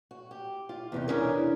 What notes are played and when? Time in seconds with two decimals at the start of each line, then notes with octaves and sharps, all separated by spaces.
0.11 F#4
0.31 G4
0.69 F4
0.92 E2 C3 D#4
1.08 E2 G#3 C#4 D4 G#4 A#4